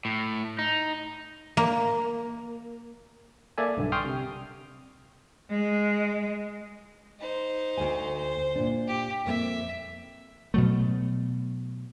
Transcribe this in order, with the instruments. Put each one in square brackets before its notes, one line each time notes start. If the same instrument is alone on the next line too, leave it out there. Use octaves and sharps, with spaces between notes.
[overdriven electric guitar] A2
D#4
[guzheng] A#3
[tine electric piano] A#3 A4 D5 E5 G#5
B1 G2 D3
G5 C6 C#6 D#6 F6
C3
[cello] G#3
[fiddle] D#4 C5
[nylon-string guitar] D2 G#5
[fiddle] C5
[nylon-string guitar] A#2 D4
[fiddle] G4
[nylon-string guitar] F2 A#3 C4 [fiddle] E5
[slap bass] B2 F#3 A3